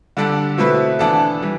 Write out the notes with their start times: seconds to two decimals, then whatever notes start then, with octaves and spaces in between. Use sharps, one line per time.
0.17 D3 G3 D4 A4
0.58 B2 A3 C4 E4 B4
0.99 E3 B3 D4 A4
1.42 E3 G3